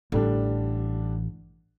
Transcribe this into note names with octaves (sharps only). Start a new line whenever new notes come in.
A1 D3 G3 D4